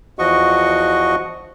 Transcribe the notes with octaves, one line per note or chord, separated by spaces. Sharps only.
E2 F3 F#4 D#5 C#6